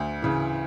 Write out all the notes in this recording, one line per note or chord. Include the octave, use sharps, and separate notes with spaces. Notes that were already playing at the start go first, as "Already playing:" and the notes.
Already playing: D2
C#3 E3